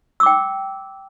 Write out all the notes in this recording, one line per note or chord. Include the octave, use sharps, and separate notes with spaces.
G5 D6 E6